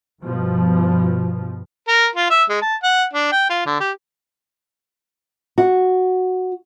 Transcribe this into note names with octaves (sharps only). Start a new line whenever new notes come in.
G2 B2 F3
A#4
F4
E5
G#3
A5
F#5
D4
G5
F4
D3
G4
F#4